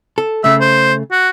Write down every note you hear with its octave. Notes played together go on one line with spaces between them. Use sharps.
A4
C#3 A3 E5
C5
F#4